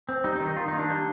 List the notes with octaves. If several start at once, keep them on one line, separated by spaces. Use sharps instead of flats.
C4
G3 D#4
D#4
D#3
D#4
D#3 F4
D#4
A#3
D4
G3